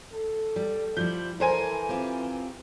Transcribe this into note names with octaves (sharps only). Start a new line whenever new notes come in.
A4
G3
F3 G3 E4 G6
E3 A4 A#4 C5 G#5
C4 F4 G4